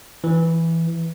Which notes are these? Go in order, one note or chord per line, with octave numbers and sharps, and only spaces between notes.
E3